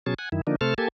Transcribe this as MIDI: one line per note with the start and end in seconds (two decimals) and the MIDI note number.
0.06 0.14 47
0.06 0.14 54
0.06 0.14 61
0.06 0.14 68
0.06 0.14 81
0.19 0.29 78
0.19 0.29 80
0.32 0.41 42
0.32 0.41 51
0.32 0.41 64
0.47 0.56 50
0.47 0.56 53
0.47 0.56 58
0.47 0.56 62
0.47 0.56 63
0.61 0.74 48
0.61 0.74 57
0.61 0.74 69
0.61 0.74 72
0.61 0.74 81
0.61 0.74 89
0.78 0.88 58
0.78 0.88 67
0.78 0.88 69
0.78 0.88 80
0.78 0.88 81